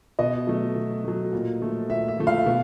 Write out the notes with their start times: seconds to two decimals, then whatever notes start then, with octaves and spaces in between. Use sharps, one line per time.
0.19 B2 D#5
0.47 F#3 A3
0.76 B2
1.04 F#3 A3
1.33 A#2
1.61 F3 A3
1.89 A#2 E5
2.08 E5
2.18 F3 A3
2.27 F5
2.46 B2